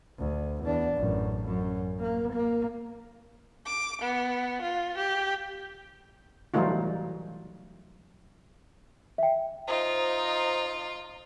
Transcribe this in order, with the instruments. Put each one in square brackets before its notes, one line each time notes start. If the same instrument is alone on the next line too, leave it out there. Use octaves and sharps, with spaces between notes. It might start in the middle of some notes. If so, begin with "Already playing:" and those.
[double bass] D2
E2 D4
A1 F#2
F#2
A#3
A#3
[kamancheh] D6
B3
F4
G4
[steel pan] E3 F#3 G3 A3 D#4 F4
[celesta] E5 G5
[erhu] D#4 [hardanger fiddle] F4 [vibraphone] C5